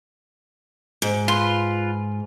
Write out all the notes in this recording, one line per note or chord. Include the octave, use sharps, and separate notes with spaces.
G#2
F4 B4 C6